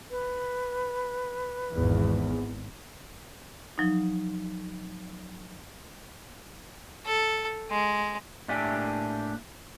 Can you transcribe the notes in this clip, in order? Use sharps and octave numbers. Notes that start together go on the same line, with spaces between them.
B4
G#1 E2
F3 F#3 D#4
A4
G#3
A2 A#3 D4 G4 E5 G#5